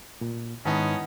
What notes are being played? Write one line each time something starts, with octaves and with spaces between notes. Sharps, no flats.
A#2
G#2 D#3 B3 C#4 D#4 E4 A5